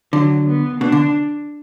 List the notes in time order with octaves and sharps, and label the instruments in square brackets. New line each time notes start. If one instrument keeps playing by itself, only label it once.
[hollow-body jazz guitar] D3 [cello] F#3
[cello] B3
[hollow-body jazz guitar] B2 [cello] D4
[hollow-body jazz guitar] D3